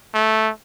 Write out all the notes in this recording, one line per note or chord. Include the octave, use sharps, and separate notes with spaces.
A3